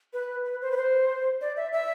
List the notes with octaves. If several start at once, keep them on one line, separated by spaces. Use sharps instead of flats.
B4
B4
C5
B4
C5
D5
E5
E5